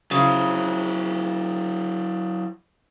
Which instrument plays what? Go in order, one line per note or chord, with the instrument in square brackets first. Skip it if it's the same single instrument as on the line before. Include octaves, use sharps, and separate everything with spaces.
[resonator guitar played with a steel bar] C#3 F3 [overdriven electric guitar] F#3 E4